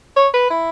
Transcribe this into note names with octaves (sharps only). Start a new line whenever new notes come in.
C#5
B4
E4